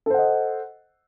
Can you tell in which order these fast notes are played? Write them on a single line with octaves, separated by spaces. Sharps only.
A4 C5 F#5 D#5